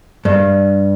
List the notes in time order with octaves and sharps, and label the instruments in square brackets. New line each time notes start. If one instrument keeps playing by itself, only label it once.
[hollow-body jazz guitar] G2